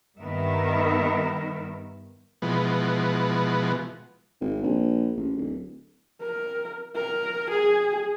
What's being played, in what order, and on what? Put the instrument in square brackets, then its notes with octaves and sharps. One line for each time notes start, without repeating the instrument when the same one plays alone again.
[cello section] G2 D#3 B3 A#4 E5
[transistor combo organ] B2 E3 F3 G#3 B3
[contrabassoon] G#1
A#1
A1
D1
[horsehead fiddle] A#4
A#4
G#4